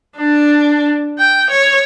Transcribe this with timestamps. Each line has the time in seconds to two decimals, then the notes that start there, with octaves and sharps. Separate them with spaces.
0.17 D4
1.18 G5
1.50 C#5